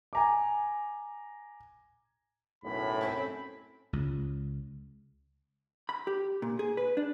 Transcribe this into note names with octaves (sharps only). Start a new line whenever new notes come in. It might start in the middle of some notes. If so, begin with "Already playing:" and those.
G#5 A#5 D6
B1 F#2 A2 B5
C4 C#4 A4
C#2
B5
G4
A#2
G#4
B4
D4